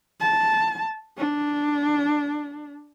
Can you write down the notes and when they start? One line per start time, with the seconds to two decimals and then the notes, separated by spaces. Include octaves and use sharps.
0.21 A5
1.18 D4